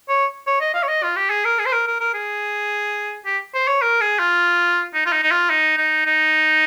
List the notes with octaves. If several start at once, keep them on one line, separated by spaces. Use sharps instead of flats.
C#5
C#5
D#5
F5
C#5
D#5
F4
G4
G#4
A#4
G#4
C5
A#4
A#4
A#4
G#4
G4
C5
C#5
A#4
G#4
F4
D#4
F4
D#4
D#4
F4
D#4
D#4
D#4